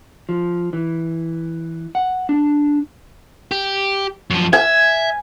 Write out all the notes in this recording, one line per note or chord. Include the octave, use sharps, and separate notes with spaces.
F3
E3
F#5
D4
G4
F#2 F3
E5 G#5